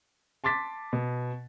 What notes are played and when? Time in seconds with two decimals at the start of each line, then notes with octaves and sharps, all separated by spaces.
0.44 A5 C6 D6 A6 B6
0.93 B2